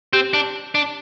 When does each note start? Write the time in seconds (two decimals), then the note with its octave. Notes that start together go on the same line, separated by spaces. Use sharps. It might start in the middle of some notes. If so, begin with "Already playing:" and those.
0.13 C4 G4
0.34 D4
0.75 D4